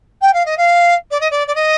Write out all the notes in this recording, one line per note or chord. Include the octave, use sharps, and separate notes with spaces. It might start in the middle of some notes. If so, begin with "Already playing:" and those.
G5
F5
D#5
F5
D5
D#5
D5
D5
D#5